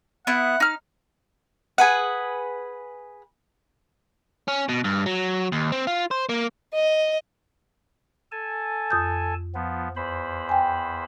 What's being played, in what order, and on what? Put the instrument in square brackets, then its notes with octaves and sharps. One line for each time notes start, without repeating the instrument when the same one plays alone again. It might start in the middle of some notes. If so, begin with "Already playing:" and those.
[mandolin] B3 E4 [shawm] F#5
[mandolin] D#4 F6
G#4 B4 F#5
[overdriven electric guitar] C#4
B2
G2
F#3
D#2
C4
F4
C5
A#3
[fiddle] D#5
[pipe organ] A4 G#5 A5
[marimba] F2 D#6 G6
[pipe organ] F3 B3
E2 C5 B5
[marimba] G5 G#5